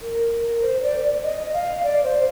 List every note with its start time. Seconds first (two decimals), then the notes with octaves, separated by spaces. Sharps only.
0.02 A#4
0.62 C5
0.82 D5
1.23 D#5
1.53 F5
1.83 D5
2.03 C5